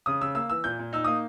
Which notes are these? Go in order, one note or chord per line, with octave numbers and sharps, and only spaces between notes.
C#3 D#6
C#3 E6
A#3 E6
E3 E6
A#2 G6
A#2
D#4 E6
A#3 D#6